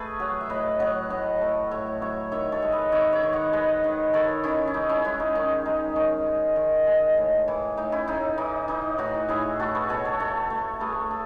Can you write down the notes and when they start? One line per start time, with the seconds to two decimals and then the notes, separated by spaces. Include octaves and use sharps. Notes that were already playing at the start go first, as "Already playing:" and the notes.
Already playing: A3 G#4 B4
0.20 F#3
0.41 E5
0.49 A2 B4 D#5
0.80 F#3 D#5 F#5
1.10 A2 D#5 F#5
1.41 A3
1.71 A2 C#5 E5
2.01 F#3 C#5 E5
2.32 D#3 C#5 E5
2.52 A4 C#5
2.62 G#3
2.72 B4 D#5
2.92 D#3 C#5 E5
3.12 C#5 E5
3.23 D#3
3.32 D#5 F#5
3.53 G#3 B4 D#5
3.84 D#3
4.13 D#3 A4 C#5
4.44 D#3 C#4 E4
4.67 C#4
4.74 G#3 D#4
4.89 C#4 E4
5.04 G#3 C#4 E4
5.20 D#4
5.35 D#3 C#4
5.65 G#3 D#4
5.96 D#3 C#4
6.26 G#3
6.56 D#3
6.87 G#3
7.17 A2
7.48 E3
7.77 A2 D#4
7.92 C#4 E4
8.08 A2 D#4
8.38 E3 D#4
8.68 E3 D#4
8.98 A2 D#4 F#4
9.29 A2 E4 G#4
9.59 A3 F#4 A4
9.75 G#4 B4
9.89 B2 A4 C#5
10.05 A4 C#5
10.19 A3 A4 C#5
10.50 A3
10.80 A3 G#4 B4
11.10 A4